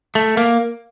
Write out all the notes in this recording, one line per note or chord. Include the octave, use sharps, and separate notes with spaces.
A3
A#3